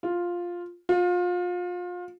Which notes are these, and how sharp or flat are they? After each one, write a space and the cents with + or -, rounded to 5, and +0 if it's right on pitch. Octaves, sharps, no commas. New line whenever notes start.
F4 +5
F4 +30